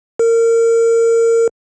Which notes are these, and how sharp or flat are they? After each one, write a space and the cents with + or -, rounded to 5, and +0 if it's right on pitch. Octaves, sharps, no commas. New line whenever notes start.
A#4 -25